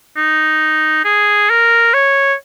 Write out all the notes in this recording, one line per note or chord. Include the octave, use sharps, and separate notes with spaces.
D#4
G#4
A#4
C#5